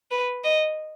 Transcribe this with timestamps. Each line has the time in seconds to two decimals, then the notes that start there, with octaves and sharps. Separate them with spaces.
0.11 B4
0.44 D#5